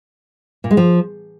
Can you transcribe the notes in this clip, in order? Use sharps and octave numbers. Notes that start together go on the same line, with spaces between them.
A#2
G#3
F3